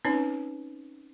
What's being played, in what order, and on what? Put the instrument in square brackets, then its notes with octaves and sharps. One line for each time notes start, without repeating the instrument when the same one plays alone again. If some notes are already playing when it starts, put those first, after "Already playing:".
[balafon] C4 C#4 D#4 B4 C#5